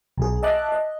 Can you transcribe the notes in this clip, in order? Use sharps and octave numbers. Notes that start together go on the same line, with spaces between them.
B1 G#4
D#5 E5 A5 D6 F#6
D#5